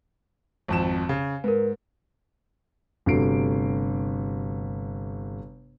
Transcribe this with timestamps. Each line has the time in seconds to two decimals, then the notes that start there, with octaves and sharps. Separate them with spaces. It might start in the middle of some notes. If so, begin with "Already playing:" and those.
0.68 G#1 F2 E7
1.09 C#3
1.44 G#2 A#4 B4
3.06 G1 C3 A3 F#4 C7 D7